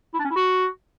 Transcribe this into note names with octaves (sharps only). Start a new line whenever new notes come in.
E4
D4
C#4
E4
F#4